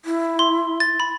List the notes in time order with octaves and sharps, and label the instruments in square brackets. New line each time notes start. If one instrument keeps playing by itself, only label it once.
[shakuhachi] E4
[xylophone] C6
A6
B5